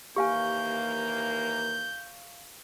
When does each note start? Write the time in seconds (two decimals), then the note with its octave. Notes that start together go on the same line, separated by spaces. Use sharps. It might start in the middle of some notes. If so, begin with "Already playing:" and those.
0.16 D#2 E3 A#3 G4 F5 G#5 C#6 G6